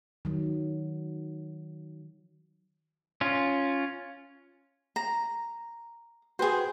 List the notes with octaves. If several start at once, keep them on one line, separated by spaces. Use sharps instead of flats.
D#3 F#3
C#4 F4
A#5
F#4 G#4 B4 C5 G5